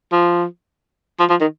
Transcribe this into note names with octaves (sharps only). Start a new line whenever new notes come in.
F3
F3
F3
D#3